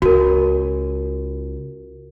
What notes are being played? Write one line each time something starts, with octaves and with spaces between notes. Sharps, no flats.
C#2 F#4 A#4